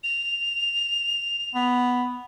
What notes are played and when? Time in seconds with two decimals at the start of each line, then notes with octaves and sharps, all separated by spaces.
0.04 F7
1.55 B3